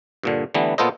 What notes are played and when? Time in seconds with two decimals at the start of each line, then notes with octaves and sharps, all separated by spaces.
0.23 G2 A#2 D3
0.54 D3 E3 G3 A3 B3
0.78 A#2 B3 F4 A4 C5 D#5